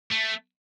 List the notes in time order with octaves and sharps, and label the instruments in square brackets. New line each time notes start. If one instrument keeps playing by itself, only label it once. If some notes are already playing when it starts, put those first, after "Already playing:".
[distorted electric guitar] A3